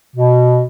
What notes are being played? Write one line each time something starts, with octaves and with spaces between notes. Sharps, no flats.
B2